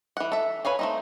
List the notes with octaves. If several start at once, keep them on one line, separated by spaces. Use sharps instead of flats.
E3 F#5
A4 E5
B4 C#5 F5 G#5
A3 C4 D#4